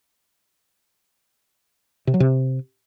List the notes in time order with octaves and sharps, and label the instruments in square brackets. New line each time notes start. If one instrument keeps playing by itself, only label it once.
[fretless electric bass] C3
F#3
C3